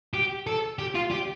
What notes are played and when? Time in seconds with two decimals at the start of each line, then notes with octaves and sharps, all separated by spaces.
0.13 G4
0.47 A4
0.79 G4
0.95 F4
1.12 G4